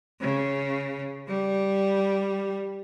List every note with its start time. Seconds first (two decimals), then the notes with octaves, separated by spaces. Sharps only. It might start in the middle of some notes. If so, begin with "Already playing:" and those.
0.21 C#3
1.28 G3